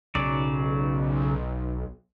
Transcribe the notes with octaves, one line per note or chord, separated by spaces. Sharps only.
B1 C#3 F#3 D5